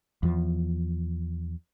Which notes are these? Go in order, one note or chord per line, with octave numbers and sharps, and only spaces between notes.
E2 F3